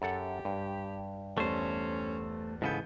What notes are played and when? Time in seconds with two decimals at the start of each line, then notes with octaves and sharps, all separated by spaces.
0.02 F#2 G4 A4 F#5
0.45 G2
1.38 E2 G3 A3 C#4 C5
2.62 G#2 C#3 E3 B3 A4 G6